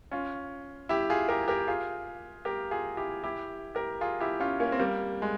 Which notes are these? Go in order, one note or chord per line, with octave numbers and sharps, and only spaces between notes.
C#4 F4
E4 G4
F4 G#4
G4 A#4
G4 A#4
F4 G#4
G4 A#4
F4 G#4
E4 G4
E4 G4
G4 A#4
F4 G#4
E4 G4
C#4 F4
A#3 C#4
C4
G3 A#3
G#3